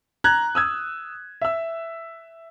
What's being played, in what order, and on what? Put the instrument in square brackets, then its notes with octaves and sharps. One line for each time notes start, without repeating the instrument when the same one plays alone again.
[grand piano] A#5 F#6 G#6
D#6 E6 G#6
E5 E6